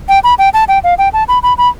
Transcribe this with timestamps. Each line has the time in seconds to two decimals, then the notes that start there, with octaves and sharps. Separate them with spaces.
0.09 G5
0.24 B5
0.39 G5
0.54 A5
0.68 G5
0.84 F5
0.98 G5
1.13 A5
1.28 B5
1.43 B5
1.58 B5